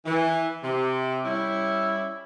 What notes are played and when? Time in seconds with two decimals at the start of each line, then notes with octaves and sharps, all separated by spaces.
0.06 E3
0.63 C3
1.25 G3 C#4 E4